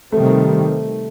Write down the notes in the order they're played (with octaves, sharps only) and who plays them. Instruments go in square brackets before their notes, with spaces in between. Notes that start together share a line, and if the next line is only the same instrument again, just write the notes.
[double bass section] C3 D#3 G3 C4 [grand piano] A3